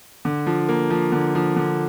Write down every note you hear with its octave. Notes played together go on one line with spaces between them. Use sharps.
D3
F3
A#3
F3
D3
F3
D3